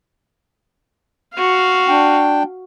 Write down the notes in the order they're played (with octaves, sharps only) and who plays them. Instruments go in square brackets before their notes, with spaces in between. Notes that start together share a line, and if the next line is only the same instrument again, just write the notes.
[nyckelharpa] F#4 F5
[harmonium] D4 G5